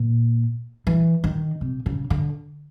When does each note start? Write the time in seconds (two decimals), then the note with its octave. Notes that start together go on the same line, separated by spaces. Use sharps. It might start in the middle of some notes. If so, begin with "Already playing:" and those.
Already playing: A#2
0.87 E3
1.24 D#3
1.61 C3
1.86 C#3
2.10 D3